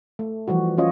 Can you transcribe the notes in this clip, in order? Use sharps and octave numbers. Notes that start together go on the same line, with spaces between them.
A3
E3 F3 G3 F#4
F#3 C#4 F4 C#5 D#5